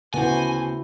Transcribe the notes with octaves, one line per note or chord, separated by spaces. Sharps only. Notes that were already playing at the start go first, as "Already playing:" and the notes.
D2 C#3 B3 E4 F#4 C5 F#5 G#5